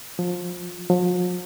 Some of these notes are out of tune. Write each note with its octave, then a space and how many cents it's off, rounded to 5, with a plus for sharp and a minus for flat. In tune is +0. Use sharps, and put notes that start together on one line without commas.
F3 +25
F3 +45